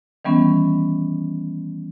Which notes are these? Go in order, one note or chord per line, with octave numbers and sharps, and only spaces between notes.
D#3 E3 G3 B3 C#4